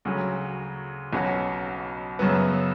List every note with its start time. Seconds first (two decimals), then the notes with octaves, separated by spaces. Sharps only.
0.05 D2 C#3 F#3 C#4
1.13 B1 B2 F#3 C#4 F#4
2.19 F#2 C#3 F#3 B3